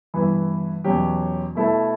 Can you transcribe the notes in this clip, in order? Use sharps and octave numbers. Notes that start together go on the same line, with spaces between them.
G2 E3 B3 E4
E2 B2 F#3 C#4 G4
B2 A3 E4 A4